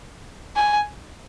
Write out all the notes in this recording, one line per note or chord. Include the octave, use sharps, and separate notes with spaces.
G#5